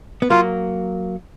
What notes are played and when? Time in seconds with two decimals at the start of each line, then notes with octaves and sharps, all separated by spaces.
0.22 B3
0.30 F#3 A#3 F4